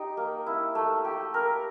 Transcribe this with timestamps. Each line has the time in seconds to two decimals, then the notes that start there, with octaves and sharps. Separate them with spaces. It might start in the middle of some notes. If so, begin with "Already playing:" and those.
Already playing: D#4 G4
0.17 A#3
0.46 E4
0.75 A3
1.05 G4
1.34 A#4